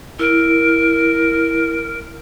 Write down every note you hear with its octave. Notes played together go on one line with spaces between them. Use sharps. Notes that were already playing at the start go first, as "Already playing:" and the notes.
E4 A#4